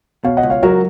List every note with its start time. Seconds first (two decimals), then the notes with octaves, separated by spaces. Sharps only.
0.24 B2 C#5 F5
0.37 D#5 F#5
0.43 C#2
0.50 C#5 F5
0.63 F#3 F#4 A#4